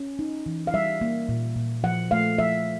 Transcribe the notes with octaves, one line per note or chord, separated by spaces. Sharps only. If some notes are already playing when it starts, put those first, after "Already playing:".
Already playing: C#4
D#4
E3
F5
G3 E5
A#3
A#2
A#2
F3 F#5
A3 F5
F3 E5